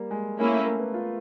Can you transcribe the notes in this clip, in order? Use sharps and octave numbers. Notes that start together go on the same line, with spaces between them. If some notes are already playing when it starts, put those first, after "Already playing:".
Already playing: G3 A#3
G#3
G#3 A#3 C#4 E4
A3
A#3
B3
F4